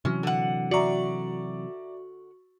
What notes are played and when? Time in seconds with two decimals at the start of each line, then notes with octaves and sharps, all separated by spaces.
0.05 C3 E3 F#3 C#4
0.23 D3 F#5
0.71 F#4 D5 E5 A#5 C#6